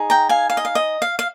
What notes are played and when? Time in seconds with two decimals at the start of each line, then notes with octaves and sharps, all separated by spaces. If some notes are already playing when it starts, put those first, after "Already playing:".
Already playing: D#4 G#4
0.10 G5 A#5
0.29 F5 G#5
0.50 F5
0.57 D#5
0.65 F5
0.75 D#5
1.02 F5
1.19 F5